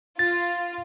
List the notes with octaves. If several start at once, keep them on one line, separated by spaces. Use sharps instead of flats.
F4 A6